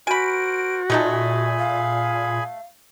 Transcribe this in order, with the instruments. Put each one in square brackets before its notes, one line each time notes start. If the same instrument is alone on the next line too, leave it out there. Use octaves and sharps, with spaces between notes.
[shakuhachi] F#4 [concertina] A#4 C5 [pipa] G#5 B5 [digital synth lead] D7
[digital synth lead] A#2 [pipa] A3 D#4 A5 [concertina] G#4 G#5 B5
[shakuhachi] F5